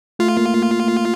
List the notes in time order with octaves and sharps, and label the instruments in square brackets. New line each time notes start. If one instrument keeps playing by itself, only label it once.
[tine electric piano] A3 [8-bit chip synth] F4
[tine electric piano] A#3